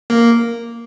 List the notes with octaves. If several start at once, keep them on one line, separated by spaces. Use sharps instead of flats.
A#3